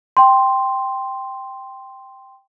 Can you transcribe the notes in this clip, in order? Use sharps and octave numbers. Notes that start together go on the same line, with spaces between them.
G5 C6